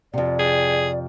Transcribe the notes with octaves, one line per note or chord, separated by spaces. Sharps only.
F2 C3 D5
G#4